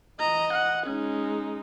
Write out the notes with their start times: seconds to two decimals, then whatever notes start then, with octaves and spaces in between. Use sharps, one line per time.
0.20 E3 D#5 A#5
0.53 F#5
0.87 G#3 C#4 D#4